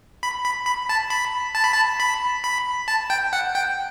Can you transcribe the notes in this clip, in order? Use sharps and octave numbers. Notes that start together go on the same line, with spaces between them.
B5
B5
B5
A5
B5
A5
B5
A5
B5
B5
A5
G5
F#5
G5